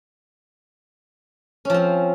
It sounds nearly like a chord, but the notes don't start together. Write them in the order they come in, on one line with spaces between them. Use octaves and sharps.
C#4 F3 C4